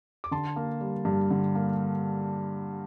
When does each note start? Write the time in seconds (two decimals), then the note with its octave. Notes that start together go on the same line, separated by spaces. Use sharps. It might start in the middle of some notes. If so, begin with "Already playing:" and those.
0.24 D6
0.31 D3 A5 C6
0.56 A#3
0.81 G3
1.05 G2
1.31 D3
1.55 A#3